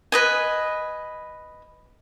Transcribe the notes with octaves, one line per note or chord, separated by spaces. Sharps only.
B4 D#5 G#5